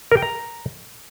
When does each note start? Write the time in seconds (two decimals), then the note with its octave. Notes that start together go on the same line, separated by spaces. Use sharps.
0.12 A#4
0.17 G5
0.22 A#5